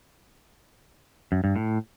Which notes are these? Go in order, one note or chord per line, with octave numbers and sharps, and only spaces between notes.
F#2
G2
A2